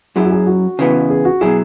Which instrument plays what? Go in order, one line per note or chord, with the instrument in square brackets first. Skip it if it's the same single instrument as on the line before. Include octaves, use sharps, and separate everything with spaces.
[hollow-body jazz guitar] F#2 F#3 E4 [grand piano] G#4
[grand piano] F#4
G#4
F#4
[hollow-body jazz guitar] C#3 E3 B3
[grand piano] G#4
F#4
[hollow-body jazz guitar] B2 F#3 E4 [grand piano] G#4